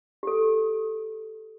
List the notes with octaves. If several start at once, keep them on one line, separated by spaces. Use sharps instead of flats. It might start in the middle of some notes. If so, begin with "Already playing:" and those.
G4 A4